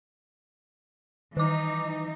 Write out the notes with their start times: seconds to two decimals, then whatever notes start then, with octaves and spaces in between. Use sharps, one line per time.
1.37 D#3 E3 D#4 D6